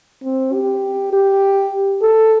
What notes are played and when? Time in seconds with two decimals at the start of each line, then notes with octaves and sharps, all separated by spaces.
0.23 C4
0.53 G4
1.13 G4
2.02 A4